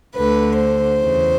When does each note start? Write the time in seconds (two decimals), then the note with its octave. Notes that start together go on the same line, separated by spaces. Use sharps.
0.15 D2 D3 B4
0.59 C5
1.01 E2 C#3 E3